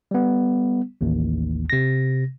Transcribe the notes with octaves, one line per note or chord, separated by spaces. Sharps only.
G3 B3
A1 D#2
C3 A#6